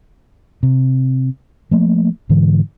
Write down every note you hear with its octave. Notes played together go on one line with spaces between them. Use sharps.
C3
F3 A3 A#3
G#2 D3 E3